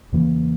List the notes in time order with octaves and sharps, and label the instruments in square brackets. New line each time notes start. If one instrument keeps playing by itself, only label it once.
[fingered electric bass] E2 C#3 E3 A#3